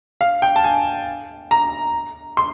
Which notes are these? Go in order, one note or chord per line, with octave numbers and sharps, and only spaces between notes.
F5
G5
A5
G#5
A#5
C6